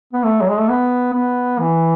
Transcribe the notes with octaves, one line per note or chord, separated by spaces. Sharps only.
B3
A3
F#3
G#3
A3
B3
B3
E3